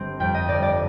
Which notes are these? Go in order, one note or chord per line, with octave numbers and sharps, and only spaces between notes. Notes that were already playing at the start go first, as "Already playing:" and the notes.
Already playing: G1 C4
F2 G5
D#5
G1 D5
D5